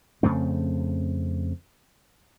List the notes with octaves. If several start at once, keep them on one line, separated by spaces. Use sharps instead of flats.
F2 C#3 A3 C4